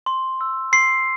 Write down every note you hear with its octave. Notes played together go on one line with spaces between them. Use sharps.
C6
E6
C6 C7